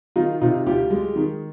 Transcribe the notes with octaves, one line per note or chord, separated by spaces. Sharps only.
D#3 D#4 F4
C3 D#4 F4
D2 F4 G4
G#3
D#3